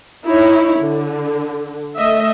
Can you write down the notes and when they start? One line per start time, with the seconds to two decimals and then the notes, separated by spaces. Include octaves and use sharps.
0.25 D#4 E4 C#5
0.80 D3
1.96 A3 D#5 E5